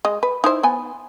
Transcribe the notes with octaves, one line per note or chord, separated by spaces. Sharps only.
G#3 D#5
B4
D#4 E4 C5
B3 G#5